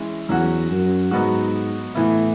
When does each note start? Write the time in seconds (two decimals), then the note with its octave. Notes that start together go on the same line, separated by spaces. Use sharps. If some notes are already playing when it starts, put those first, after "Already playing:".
Already playing: E3 G#3 C#4 E4
0.29 E2 F#3 C#4 F#4
0.71 F#2
1.11 G#2 F#3 B3 D#4 F#4
1.94 A2 E3 B3 E4